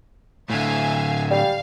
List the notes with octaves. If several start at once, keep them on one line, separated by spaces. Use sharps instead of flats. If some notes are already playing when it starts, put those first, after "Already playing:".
A2 D3 E5 F5 G#5
G3 F5